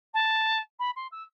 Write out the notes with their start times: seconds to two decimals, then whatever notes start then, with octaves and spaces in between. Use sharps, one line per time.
0.14 A5
0.79 B5
0.96 C6
1.11 E6